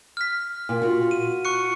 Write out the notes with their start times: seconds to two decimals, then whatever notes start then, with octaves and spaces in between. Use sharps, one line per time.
0.17 F6 B6
0.69 A#2
0.82 F4 F#4
1.11 D#7
1.45 C#6 F#6 C#7